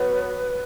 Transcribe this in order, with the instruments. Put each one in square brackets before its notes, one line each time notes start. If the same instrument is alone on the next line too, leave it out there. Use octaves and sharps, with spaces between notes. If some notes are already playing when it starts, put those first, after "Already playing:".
Already playing: [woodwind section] F#3 B3 [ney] B4